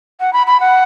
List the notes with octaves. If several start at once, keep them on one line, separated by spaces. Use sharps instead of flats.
F#5
B5
B5
F#5